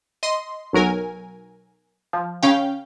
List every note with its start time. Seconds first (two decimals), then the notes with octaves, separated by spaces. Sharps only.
0.23 D#5 C6
0.73 B1 F#3 A#4 G#5
2.13 F3
2.43 C#3 C#4 F5 G5